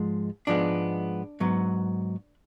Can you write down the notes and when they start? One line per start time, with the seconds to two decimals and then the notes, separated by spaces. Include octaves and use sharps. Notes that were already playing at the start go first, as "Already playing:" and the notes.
Already playing: G#2 F3 G#3
0.47 G#2 F3 G#3 B3 D4
1.40 G#2 F#3 B3